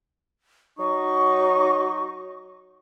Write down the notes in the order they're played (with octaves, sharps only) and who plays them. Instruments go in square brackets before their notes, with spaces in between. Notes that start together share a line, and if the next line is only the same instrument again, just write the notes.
[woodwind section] F#3 D#4 [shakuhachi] C#6